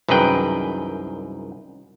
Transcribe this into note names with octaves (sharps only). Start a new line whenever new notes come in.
C2 F#2 D#3 G#4 B4 G5